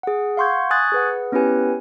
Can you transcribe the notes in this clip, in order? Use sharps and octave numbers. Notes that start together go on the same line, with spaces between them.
G#4 F#5
F5 F#5 C6 C#6 G6 G#6
G#5 C#6 D#6 F#6 G#6 A6
G#4 B4 F#5
B3 C#4 E4 G4 B4 G#5